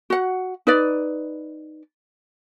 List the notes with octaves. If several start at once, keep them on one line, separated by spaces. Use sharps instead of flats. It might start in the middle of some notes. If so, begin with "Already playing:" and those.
F#4 F#5
D#4 B4 D5